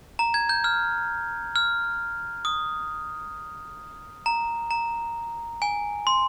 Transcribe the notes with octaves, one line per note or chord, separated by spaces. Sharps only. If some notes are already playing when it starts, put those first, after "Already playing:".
A#5
G#6
G6
F6
F6
D#6
A#5
A#5
G#5
C6